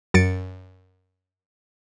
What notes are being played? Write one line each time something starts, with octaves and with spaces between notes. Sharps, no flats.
F#2 A6 C#7 D7